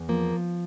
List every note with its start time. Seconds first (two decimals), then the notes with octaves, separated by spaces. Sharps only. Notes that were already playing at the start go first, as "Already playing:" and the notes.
Already playing: E2
0.09 F3 A#3